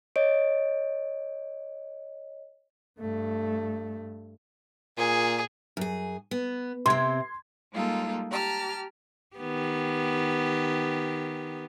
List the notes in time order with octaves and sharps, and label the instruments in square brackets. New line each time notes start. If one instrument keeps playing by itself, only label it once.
[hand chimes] C#5 D#5 D7
[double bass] G2 A3
[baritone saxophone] A#2 [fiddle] G#4
[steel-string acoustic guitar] F#2 G#4
B3
[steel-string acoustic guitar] C3 C4 [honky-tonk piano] C6 G#6
[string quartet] G3 G#3 A#3 D#4 F4 A4
G4 A5 A#5 F6
[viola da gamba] D#3 B3 G4